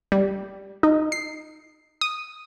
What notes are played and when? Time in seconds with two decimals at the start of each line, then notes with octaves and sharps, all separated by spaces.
0.12 G3
0.83 D#4
1.12 C7
2.01 D#6